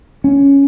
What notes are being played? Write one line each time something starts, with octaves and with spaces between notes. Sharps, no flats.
C#4